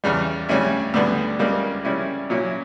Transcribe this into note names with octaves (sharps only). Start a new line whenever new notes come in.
E2 C#3 G3
D2 C#3 G3 C#4 E4
D2 D3 G3 B3 D4
C#2 C#3 G3 A#3
C#3 G3 C#4 E4
A#2 F#3 C#4 E4